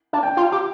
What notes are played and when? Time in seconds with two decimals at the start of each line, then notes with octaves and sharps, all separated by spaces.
0.13 D4
0.23 G5
0.37 F4
0.52 G4